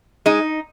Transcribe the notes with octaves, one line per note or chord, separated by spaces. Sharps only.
G#3 D#4